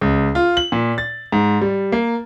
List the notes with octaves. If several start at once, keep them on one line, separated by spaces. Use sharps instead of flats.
C#2
F4
F#7
A#2
A6
G#2
G3
A#3